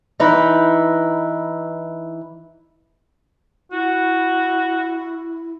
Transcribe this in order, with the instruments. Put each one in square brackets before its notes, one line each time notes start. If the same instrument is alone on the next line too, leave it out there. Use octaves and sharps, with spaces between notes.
[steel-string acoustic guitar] E3 D#4 E4 B4
[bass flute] E4 [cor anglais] F#4